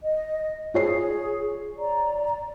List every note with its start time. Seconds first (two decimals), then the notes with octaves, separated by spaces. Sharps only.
0.03 D#5
0.74 F4 G#4 C#5 C7
1.78 D5 A#5